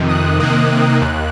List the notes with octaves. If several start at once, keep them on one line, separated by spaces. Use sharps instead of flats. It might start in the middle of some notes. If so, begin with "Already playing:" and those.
Already playing: F2 C3 D#3
D#6 F#6
C3 D#3 A#3 D#6 F#6
D#2 F#6